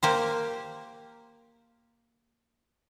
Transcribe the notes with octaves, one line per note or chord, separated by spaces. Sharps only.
A#3 G4 C5